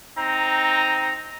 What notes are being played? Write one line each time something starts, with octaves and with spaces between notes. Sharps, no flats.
C4 D#4 A#5